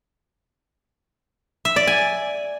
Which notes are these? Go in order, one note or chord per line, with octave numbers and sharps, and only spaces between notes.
E5
D5
G#5